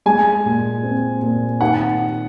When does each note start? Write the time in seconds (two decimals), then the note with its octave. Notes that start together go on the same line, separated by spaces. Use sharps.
0.06 G#3 G#5
0.45 A#2
0.83 C4
1.22 A#2
1.61 D#3 F#5